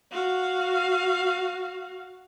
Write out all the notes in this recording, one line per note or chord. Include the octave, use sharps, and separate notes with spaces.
F#4 F5